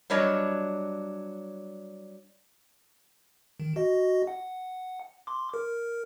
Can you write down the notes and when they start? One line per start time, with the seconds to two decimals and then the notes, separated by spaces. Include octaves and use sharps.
0.10 F#3 G3 D4 C#5 D#5
3.60 D#3
3.76 F#4 D#5
4.27 F#5
5.27 C6 D6
5.54 A#4